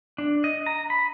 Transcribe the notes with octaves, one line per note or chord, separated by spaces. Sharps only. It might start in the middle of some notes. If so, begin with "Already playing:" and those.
D4
D#5
A#5
B5